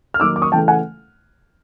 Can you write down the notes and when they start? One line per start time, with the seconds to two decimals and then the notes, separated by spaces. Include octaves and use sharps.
0.14 F6
0.20 D#3 F#3 A#3 D#4 D6 E6
0.36 D6
0.42 C#6 D#6
0.52 C#3 E3 A3 G5 A5
0.68 F#5 G#5